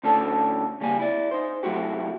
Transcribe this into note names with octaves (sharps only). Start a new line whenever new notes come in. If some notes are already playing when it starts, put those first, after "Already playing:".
D2 A2 C#4 D4 A4 A5
C#3 G3 A#3 G#5
E4 D5
D#4 C5
C3 F#3 A3 E4 F#4 G4